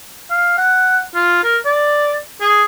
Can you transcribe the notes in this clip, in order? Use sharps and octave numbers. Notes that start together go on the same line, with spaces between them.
F5
F#5
F4
A#4
D5
G#4